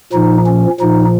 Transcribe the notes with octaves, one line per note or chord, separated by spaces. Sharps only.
A#2 F3 D#4
C#4
A#2 F3 D#4